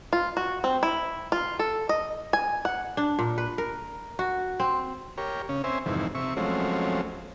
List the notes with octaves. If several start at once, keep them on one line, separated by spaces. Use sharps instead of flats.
F4
F#4
C4
E4
F4
A4
D#5
G#5
F#5
D4
A#2
B4
A#4
F#4
C4
G4 A#4 C#5
C#3 C#4
C4 C5 C#5 E5 G#5
F2 G#2 C3 D#3 E3
C3 E5 C#6
F3 F#3 G#3 A3 C4 C#4